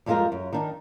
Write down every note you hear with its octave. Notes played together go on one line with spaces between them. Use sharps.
F2 G3 G#3 E4 F4 A#4
F#2
D#3 D4 D#4